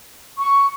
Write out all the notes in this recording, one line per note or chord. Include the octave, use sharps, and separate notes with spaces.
C#6